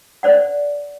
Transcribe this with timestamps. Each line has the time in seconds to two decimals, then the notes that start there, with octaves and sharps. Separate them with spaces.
0.23 C5 D5 F#5